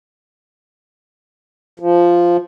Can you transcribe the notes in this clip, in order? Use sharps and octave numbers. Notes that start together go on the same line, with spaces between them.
F3